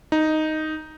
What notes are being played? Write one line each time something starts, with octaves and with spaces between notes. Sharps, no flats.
D#4